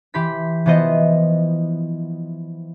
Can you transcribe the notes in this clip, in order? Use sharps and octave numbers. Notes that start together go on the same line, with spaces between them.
E3 G4 B5 C6 B6
E3 F3 B3 C5 D#5 E5